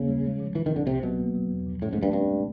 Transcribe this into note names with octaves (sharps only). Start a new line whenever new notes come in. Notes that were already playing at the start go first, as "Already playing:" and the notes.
Already playing: D#2 C#3 A#3
G3
G#3
F3
E3 E4
D#3
C4
D3
C2 C3
B2 F#3
A#3
F#3
E2
F3
A2 C#4
G#2
G2 A3
G2 C4
G#3